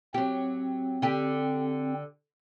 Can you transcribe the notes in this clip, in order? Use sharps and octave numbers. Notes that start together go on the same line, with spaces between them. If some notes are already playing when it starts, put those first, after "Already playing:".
F#3 C4 G4
D3 G4